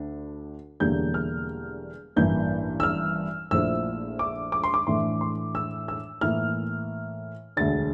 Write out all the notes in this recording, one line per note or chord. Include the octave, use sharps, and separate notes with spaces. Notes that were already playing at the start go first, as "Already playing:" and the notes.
Already playing: D2 D4
E1 E2 D3 G3 A#3 G6
F6
A1 G2 E3 A#3 G6
E6
F6
A#1 A#2 F3 A3 E4 E6
D6
D6
C6
D6
A2 E3 A3 D4 C6
C6
E6
E6
A2 E3 A#3 F6
E1 D2 D3 A6